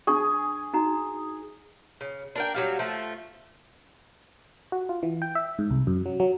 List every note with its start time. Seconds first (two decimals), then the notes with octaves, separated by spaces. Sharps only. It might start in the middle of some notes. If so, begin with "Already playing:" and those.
0.07 D4 G#4 C#6
0.74 D#4 F#4 A#5
2.01 C#3
2.35 D4 A#4 G5
2.55 F#3 G3 F5
2.79 F3 A3
4.72 F#4
4.89 F4
5.03 E3
5.22 G5
5.35 E5
5.59 G#2
5.71 C2
5.87 F#2
6.06 F#3
6.20 F#3